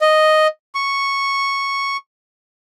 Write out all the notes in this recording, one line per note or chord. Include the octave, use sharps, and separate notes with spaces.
D#5
C#6